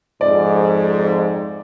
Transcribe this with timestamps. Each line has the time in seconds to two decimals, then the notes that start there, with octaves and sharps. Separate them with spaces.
0.21 F2 G#2 D5